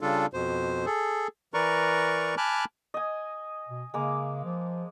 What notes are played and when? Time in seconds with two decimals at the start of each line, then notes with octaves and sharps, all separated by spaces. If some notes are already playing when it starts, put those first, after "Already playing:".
0.01 C#3 G3 D4 F4 A4
0.33 F2 B2 C5
0.86 G#4 A4
1.54 E3 A#4 B4 D5 A#5 C#6
2.37 G#5 A5 B5 D6 F6 F#6
2.94 D#5 G#5
3.69 B2
3.94 C#3 G#3 A#3 D6
4.44 F3